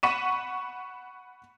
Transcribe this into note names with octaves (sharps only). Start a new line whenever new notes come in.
F#5 B5 C#6 B6 D#7 E7